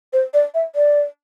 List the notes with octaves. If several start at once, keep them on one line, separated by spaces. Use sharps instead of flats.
C5
D5
E5
D5